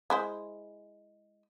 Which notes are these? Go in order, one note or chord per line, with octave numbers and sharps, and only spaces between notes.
G#3 E4 C5